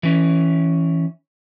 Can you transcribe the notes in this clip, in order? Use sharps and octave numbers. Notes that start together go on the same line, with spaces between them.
E3 C#4